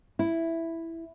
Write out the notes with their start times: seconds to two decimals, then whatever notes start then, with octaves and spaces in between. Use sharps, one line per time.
0.19 E4